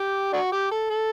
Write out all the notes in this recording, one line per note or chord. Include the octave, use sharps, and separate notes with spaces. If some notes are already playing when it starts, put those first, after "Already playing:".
Already playing: G4
D4 F#4
G4
A4
A4